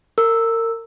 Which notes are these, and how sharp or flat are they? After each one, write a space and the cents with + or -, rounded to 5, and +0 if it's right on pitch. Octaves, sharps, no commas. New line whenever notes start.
A#4 -30 E6 +0